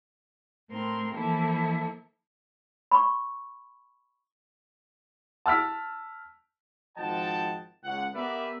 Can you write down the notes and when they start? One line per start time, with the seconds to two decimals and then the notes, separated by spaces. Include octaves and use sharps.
0.70 A2 C4 A#4 C6
1.14 E3 F3 A#3 E4 A4
2.91 B5 C#6
5.46 A5 E6 F6 B6
6.97 G#1 F3 D#5 F#5 G5 A5
7.84 C#2 F#5
8.14 B3 G4 A#4 B4 D5 E5